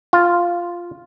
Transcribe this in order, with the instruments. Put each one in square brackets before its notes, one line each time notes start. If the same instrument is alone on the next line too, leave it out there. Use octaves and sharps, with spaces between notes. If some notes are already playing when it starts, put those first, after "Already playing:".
[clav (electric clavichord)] F4